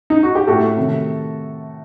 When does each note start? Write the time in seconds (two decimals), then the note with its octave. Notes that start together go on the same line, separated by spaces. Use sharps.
0.10 D#4
0.23 F#4
0.35 G4
0.47 A2 A3 F#4 A4
0.77 C3 D#3 A3